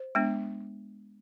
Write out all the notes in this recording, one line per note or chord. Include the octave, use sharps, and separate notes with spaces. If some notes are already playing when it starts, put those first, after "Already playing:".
Already playing: C5
G#3 B3 D4